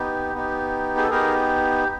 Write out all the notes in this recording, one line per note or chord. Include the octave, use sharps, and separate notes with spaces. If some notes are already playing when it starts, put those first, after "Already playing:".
Already playing: B3 D#4 G4
B3 D#4 G4
G#4
A4
B3 D#4 G4 G#4 A#4